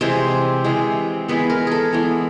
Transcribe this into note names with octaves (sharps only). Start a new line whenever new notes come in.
C3 E3 G#3 C5
C3 E3 G#3
E3 G#3 B3 B4
A#4
G#4 A4
E3 G#3 B3